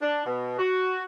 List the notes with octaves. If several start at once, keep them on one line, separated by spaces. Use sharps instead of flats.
D4
B2
F#4